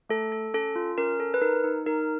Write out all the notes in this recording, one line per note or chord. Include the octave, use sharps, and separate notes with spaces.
A3 A4
A4
C#4 A4
F4
C#4 A#4
A4
B4
D#4 A#4
D#4
D#4 A#4